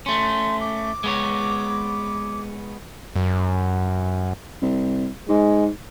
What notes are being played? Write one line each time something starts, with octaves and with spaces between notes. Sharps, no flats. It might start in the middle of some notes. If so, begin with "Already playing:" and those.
A3 C#4 C6
D6
G#3 B3 C#5
F#2
C2
G#2 G#3